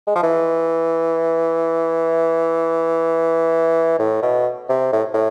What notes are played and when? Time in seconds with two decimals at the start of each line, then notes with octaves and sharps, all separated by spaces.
0.07 G#3
0.16 F3
0.23 E3
3.99 A2
4.22 B2
4.69 C3
4.93 A2
5.14 A2